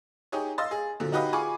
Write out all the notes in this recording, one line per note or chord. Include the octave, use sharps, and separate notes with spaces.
D#4 G4 G#4 C#5
D#5 F5 C6 E6 A6
G#4
A#2 D3 F3 F#3
D#4 F#4 G4 B4 D#5 F5
F4 G#4 G#5 B5 C#6 D6